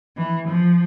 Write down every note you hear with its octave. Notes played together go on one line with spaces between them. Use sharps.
E3
F3